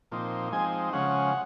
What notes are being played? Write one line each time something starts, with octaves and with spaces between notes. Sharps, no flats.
A#2 F3 C4 D#4
F3 G#3 C4 D#4 G#5
C#3 F3 G#3 C#4 F#5